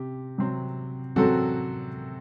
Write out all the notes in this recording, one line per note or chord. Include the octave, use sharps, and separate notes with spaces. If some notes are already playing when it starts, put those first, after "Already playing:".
Already playing: C3 C4 G4
C3 F#3 C4
C3 F#3 C4 F#4 A4